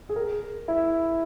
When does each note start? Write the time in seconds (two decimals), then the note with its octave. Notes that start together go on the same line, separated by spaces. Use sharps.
0.09 G#4
0.16 A#4
0.68 E4